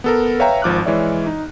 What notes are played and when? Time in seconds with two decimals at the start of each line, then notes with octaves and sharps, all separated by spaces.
0.04 B3 A4 A#4
0.39 B4 C#5 E5 F5 G5 A#5
0.62 G#1 F3 D6 F6 F#6
0.85 E3 G#3 C#5 D5 E5
1.26 D#4